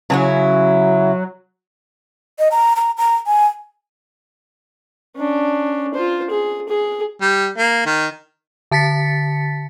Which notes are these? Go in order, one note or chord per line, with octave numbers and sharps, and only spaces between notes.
C#3 F#3 C#4 E4
D#5
A#5
A#5
A#5
G#5
C#4 D4
F4 C5
G#4
G#4
G3
A#3
D#3
D3 A5 A6 B6 C#7